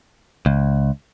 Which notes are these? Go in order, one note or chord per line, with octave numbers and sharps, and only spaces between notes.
C#2